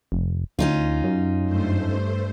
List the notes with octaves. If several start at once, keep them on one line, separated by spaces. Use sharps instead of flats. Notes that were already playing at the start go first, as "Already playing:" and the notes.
F1
D2 C#4 D#4 F4
F#2
G2 A3 C5